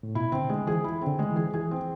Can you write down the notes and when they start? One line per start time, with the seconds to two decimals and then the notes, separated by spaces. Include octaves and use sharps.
0.03 A2
0.15 B2 E4
0.32 D3 C4
0.49 D3 G#3
0.66 E3 G#4
0.84 E4
1.02 C4
1.07 D3
1.19 G#3
1.30 E3
1.36 G#4
1.54 E3 G#4
1.71 C4